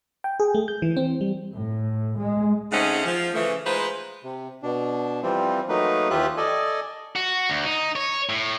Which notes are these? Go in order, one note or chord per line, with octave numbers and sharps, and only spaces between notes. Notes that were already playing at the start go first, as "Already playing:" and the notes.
G5
G#4
A3
G6
E3
C4
G3
A2
G#3
C#3 A3 C4 C#4 D#4 F#5
F3
C#3 E3 A3
G#3 D#4 F4 B4 C5
C3
B2 D4
E3 F3 G3 C4
F#3 A3 A#3 D#4 B4
D#2 E3 F4 G4 E5 F#6
A4 D5 D#5 G#5
F#4
D2
D#4
C#5
A2